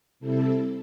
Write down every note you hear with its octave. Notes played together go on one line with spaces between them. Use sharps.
C3 G3 C4 E4 A4